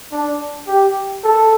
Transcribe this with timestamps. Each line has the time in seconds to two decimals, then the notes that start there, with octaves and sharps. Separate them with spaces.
0.12 D4
0.67 G4
1.24 A4